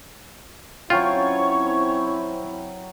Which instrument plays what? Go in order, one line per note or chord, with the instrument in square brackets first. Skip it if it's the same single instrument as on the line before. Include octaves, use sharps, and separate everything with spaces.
[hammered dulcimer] F#3 C#4 G5 [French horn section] C4 E4 [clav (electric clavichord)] F4 [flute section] C#5 C#6